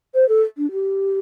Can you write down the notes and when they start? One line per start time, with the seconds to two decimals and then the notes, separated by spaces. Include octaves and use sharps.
0.15 C5
0.29 A4
0.58 D4
0.72 G4